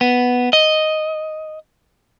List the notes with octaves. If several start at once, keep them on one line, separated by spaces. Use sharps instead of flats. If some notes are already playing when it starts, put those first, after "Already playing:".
B3
D#5